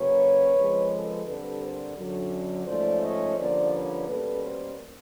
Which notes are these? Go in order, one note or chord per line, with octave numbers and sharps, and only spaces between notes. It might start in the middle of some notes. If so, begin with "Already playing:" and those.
Already playing: C#3 F#3 A#3 C#4 B4 C#5
F2 C#3 F3 G#3
A4 B4
G2 D3 G3 C4 A4 B4
A#4 C5
F#2 D3 F#3
G#2 F3 A3 C#4 C5 D5
C#5 D#5
G2 D3 F3 A#3 C#4 C5 D5
B4 C#5
B2 G3 A#3 C#4 A4 B4
A#4 C5